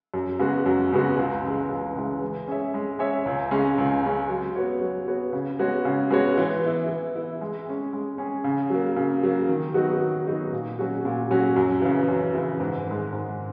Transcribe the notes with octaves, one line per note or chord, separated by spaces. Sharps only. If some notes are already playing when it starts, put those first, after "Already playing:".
F#2
C#3 G#3 B3 F#4
F#2
C#3 G#3 B3 F#4
C#2
C#3 E3 G#3
C#2
C#3 E3 G#3
G#3
C#4 G#4 C#5 E5
G#3
C#4 G#4 C#5 E5
C#2
C#3 G#3 C#4
C#2
C#3 G#3 C#4
F#3
B3 F#4 C#5
F#3
B3 F#4 C#5
C#3
G#3 B3 F#4 C#5
C#3
G#3 B3 F#4 C#5
E3
B3 E4
E3
B3 E4
G#3
C#4 G#4
G#3
C#4 G#4
C#3
F#3 A#3
C#3
F#3 A#3
D#3
F#3 B3 D#4 F#4
D#3
F#3 B3 D#4 F#4
A#2
F#3 C#4 F#4
A#2
F#3 C#4 F#4
F#2
C#3 E3
F#2
C#3 E3
G#2
D#3 G#3
G#2